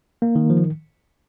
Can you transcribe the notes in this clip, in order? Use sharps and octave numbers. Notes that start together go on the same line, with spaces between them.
A#3
D#3
F3